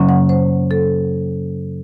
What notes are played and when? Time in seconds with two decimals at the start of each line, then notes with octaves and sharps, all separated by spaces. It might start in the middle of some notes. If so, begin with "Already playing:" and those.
Already playing: F#2 C#3 F#3 A#3 C#4
0.09 F#5
0.29 C5
0.71 A4